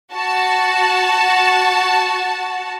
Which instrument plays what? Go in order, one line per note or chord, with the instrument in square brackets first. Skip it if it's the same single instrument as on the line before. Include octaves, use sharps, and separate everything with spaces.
[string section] F#4 A5